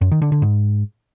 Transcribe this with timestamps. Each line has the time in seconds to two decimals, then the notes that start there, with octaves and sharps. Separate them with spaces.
0.01 F#2
0.11 D#3
0.22 D3
0.32 D3
0.42 G#2